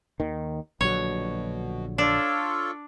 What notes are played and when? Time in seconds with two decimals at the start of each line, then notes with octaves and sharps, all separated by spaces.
0.20 D#2 D#3
0.81 A#1 B2 D3 F#3 C#5
1.98 D4 F4 A4 C#5